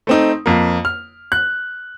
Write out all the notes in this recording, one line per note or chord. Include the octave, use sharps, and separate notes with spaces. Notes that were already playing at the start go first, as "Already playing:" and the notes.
A3 C4 D#4
F2 A#3
F6
F#6